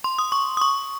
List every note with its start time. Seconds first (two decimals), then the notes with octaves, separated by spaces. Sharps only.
0.04 C6
0.18 D#6
0.32 C#6
0.57 D#6
0.61 C#6